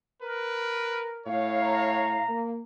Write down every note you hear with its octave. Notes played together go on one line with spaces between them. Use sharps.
A#4 B4
A2 C#5 F5
A#5
A#3